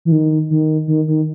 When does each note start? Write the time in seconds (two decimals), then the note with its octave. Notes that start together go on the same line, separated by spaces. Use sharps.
0.05 E3
0.12 D#3
0.50 D#3
0.88 D#3
1.08 D#3